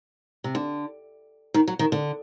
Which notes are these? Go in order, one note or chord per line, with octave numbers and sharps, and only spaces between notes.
C3
D3
D#3
F#3
D#3
D3